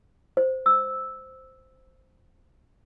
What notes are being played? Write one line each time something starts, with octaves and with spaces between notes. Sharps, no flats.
C5
E6